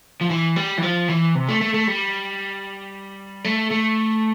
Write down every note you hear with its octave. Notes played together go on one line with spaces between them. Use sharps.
F3
E3
G3
E3
F3
E3
C3
A3
A3
A3
G3
A3
A3